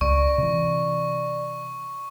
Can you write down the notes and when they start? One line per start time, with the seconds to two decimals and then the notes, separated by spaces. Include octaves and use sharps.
0.01 C#2 D5 C#6
0.38 C3 E3